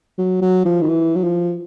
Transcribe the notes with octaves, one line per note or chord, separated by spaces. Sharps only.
F#3
F#3
F3
D#3
E3
F#3
F3